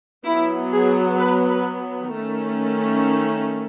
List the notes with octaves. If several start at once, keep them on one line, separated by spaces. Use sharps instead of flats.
F#3 B3 E4
G#4
B4
B4
D#3 A3 C#4